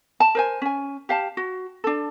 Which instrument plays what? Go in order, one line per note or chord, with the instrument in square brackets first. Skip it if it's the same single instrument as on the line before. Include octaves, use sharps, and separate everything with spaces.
[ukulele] A5
A#4 C5 G#5
C#4 G#5
G4 F5 A5
F#4
D4 A4